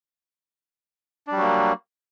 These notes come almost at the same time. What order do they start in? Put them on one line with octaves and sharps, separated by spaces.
D4 G3 F#3 A#3